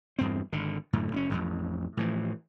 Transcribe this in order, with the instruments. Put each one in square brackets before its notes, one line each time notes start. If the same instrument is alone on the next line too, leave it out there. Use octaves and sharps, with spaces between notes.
[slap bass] E2 G2 C4
G#1 D3
F#2 A2 D3
F#1 C4 C#4
E1 A1 F2
A2 E3 F3